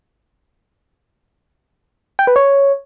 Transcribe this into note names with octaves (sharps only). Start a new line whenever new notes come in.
G5
B4
C#5